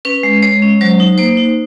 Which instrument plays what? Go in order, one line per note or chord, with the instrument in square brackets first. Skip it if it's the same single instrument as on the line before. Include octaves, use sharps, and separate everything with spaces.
[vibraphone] C#4 B4
G#3
G#3 C#5
C#4
F#3 C5
D#4
A#3 C5
D#4